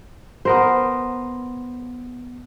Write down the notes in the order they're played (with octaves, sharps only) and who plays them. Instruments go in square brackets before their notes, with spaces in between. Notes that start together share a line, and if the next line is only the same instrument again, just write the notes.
[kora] B3 A#4 C5